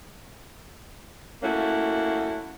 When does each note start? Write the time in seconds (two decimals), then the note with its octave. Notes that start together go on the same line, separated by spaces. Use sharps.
1.43 A3 A#3 C#4 E4 F#4